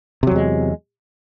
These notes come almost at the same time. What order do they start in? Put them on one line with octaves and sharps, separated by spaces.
C3 F#3 E2 G#3